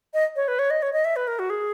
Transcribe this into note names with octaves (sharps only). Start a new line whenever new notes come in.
D#5
C#5
B4
C#5
D#5
C#5
D#5
E5
B4
A#4
F#4
G#4